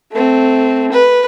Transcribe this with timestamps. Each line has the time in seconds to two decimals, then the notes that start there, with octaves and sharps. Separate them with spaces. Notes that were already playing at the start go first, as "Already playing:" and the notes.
0.12 A3 C4
0.92 B4